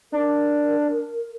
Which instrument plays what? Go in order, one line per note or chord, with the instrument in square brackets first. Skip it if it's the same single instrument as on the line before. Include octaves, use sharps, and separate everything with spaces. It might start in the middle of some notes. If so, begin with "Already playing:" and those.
[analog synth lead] D4 [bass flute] A#4